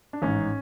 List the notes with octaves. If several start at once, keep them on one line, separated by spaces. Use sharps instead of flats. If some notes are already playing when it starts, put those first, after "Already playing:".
D4
A1 G#2 D#3 C#4